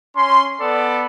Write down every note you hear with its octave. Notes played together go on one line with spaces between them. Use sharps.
C#4 C6
B3 A4 D5